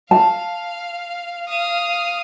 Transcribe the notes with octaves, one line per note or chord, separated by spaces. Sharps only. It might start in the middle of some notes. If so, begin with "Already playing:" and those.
F5 A5
F5 D#6